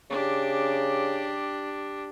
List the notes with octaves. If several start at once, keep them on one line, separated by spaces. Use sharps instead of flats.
C#3 D4 G4